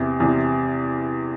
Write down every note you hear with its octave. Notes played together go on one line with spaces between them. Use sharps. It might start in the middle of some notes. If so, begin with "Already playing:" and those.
Already playing: E2 C3 E3
E2 C3 E3